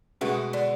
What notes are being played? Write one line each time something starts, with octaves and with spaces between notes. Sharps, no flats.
B2 G#3 A3 B3 F#4
D3